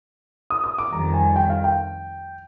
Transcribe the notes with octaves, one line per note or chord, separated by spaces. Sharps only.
D#6
D#6
D6
F2 D#3 G3 A#5
G#5
G5
F5
G5